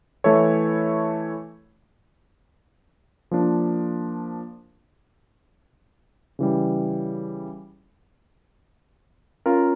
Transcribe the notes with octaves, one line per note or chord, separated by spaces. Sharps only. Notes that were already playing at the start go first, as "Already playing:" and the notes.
E3 A3 E4 A4 C#5
F3 A#3 D4
C#3 E3 G3
C#4 F4 A#4